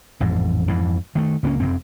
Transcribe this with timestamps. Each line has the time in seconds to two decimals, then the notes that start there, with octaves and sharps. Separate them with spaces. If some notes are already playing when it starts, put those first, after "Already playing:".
0.20 A1 F2 G#2
0.68 F2 G#2 E3
1.15 D#3 A3
1.43 C#2 A#3 C#4
1.60 F1 F#2 C4